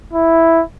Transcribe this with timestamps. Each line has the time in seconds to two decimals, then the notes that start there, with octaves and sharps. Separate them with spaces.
0.14 E4